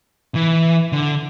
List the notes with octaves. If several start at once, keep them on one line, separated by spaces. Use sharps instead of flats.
E3
D3